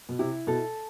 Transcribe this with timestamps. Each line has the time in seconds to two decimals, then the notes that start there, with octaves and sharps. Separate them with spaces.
0.09 B2
0.19 C3 E4
0.47 B2 A4